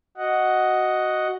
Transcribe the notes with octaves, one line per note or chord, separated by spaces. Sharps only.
F#4 D#5 F#5